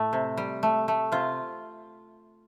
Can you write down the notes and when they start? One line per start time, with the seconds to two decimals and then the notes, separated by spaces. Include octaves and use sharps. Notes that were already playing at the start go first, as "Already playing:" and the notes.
Already playing: A2 A3
0.13 C3
0.38 G3
0.63 A3
0.88 A3
1.12 C3 F4